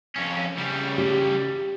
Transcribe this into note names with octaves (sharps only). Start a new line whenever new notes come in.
F2 C#4
C#3 G3
G4